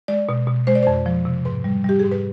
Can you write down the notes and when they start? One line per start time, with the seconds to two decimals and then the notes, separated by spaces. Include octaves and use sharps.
0.08 G#3 D5
0.29 B2
0.47 B2
0.67 G#3 C5
0.75 D5
0.83 F2 C5
1.06 F3
1.25 C3
1.45 G#2 B4
1.64 G3
1.84 G3 G4
1.99 G#2 G#4
2.12 B4